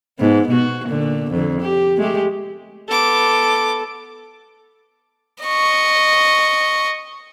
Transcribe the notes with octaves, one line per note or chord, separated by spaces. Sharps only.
G#2 B3
B2 F#4
A#2 D3
F2 D3
G4
G#3 A3 G4
B3 A4 D6
D#5 C#6